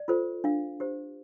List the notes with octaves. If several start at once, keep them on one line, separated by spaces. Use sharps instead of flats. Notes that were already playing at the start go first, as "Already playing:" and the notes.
Already playing: D5
F4 A4 C5
D4 F5
G4 C5